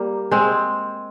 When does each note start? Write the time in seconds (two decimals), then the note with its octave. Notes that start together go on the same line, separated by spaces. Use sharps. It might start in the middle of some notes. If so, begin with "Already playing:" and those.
Already playing: G3 A#3
0.31 G#3 C4